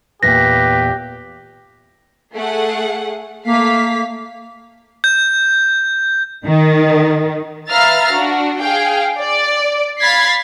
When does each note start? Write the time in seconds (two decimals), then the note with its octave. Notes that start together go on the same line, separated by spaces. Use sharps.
0.23 E2 A#2 G4 B4 A#6
2.35 A3 G#4 F#5
3.45 A3 A#3 F5 B6
5.04 G6
6.45 D#3
7.69 B4 E5 F5 A#5 F6 A6
8.14 D4 F#4
8.59 G#4 F5 G5
9.19 D5
10.01 F5 B5 G#6 A6 B6 C7